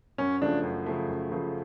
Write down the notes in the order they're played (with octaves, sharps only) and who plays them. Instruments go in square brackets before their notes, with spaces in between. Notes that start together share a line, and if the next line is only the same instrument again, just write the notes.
[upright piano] F#2 [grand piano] C#4
[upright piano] C#3 F3 A3 [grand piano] D4
[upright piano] F#2
C#3 F3 A3
F#2
C#3 F3 A3